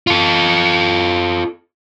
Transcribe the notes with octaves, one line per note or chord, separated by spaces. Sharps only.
F4 A4